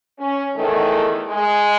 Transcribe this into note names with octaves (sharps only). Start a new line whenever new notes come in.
C#4
E2 D#3 A3
G#3